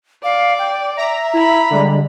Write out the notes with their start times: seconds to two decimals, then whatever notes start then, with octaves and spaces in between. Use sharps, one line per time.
0.24 D5 F5
0.59 G5
0.97 E5 A#5
1.33 E4 A#5 B5
1.70 D3 G3 G#3